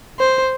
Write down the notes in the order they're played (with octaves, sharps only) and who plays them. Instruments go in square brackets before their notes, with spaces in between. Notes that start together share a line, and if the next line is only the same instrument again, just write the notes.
[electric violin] C5